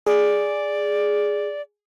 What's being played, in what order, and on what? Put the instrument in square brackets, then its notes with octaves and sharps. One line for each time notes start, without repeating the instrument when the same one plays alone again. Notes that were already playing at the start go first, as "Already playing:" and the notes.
[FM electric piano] G#4 [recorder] D5